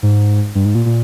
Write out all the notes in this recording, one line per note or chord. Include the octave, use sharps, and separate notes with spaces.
G#2
G2
G#2
A#2
A#2